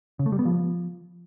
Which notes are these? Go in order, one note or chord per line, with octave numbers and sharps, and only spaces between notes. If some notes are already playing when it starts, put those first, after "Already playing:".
C#3
A3
G3
B3
F3